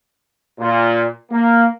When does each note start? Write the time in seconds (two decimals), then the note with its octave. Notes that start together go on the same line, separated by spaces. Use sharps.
0.60 A#2
1.32 A#3